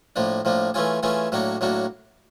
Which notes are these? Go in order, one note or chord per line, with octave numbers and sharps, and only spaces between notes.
A2 F3 A#3 D4
A2 F3 A#3 D4
E3 A3 C#4 F4 G#4
E3 A3 C#4 F4 G#4
A2 F#3 A#3 D4 F#4
A2 F#3 A#3 D4 F#4